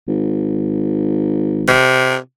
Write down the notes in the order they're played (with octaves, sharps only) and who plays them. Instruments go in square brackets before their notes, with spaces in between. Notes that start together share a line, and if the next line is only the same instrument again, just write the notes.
[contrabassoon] G#1
[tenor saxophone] C3